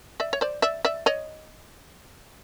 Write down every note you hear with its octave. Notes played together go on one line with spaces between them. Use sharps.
D5 E5
C#5
C5 D5
D5 E5
D5 E5
C#5 D#5